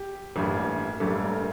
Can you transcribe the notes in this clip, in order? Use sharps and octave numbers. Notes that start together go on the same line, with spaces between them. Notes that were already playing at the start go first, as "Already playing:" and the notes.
Already playing: G4
A1 G2 E3 G3 A#3
A1 G2 E3 G3 A#3 A4
A#4